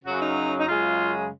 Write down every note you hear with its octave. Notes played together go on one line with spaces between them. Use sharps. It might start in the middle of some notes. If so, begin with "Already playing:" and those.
F#2 C#3 F#3 F#4
D#4
D#4
F#2 C#3 G#3 F4